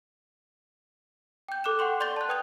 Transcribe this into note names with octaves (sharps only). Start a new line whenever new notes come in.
G5 G6
A4 D6 F#6 E7
F#5 G5 C6 C#6
D5 C6 G6 A6 G7
A5 F#6
B4 G5 D#6 G#6 F7